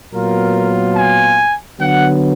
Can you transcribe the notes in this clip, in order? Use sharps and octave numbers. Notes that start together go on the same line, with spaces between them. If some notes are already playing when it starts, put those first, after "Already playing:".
A#2 F#3 B3 F4 A#4
G#5
D3 F#3 B3 F#5